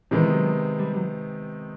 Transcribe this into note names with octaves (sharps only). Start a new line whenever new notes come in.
C3 D#3 E3 G#3 B3
F#3
G3
F#3